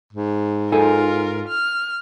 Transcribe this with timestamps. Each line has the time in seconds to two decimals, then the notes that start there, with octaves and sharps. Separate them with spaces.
0.13 G#2
0.72 D#4 F4 A4 A#4 G#5
1.48 F6